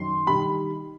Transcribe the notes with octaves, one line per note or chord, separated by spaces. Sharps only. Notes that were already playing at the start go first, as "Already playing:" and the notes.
Already playing: F#2 D#3 C6
D#3 G3 B5